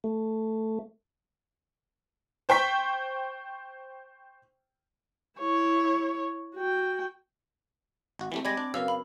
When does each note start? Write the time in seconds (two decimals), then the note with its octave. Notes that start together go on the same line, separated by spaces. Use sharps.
0.04 A3
2.49 C5 G5 C#6 B6
5.39 E4 C#5
6.55 F#4 G5
8.19 G#1 F#4
8.32 E3 G3 A3 C4
8.45 G3 G#3 D5 B5 G#6 A#6
8.57 D4
8.74 F#2 C#3 A#4 B4 F5 E6
8.88 B5